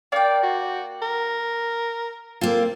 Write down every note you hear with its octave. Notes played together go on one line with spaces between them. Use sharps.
A#3 D5 G5
F#4
A#4
A#3 C4 F4 A4